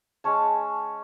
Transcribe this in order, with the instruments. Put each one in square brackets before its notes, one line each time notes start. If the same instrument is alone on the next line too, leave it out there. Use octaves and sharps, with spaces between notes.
[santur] G#3 C#4 C#5 A5